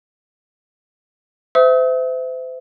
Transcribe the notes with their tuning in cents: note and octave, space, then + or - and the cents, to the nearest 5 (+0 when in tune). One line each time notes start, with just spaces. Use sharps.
C5 -35 E5 -5 D#6 +45